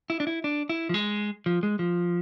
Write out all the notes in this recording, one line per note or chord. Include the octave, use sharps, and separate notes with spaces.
E4
D4
E4
D4
E4
F3
G#3
F3
G#3
F3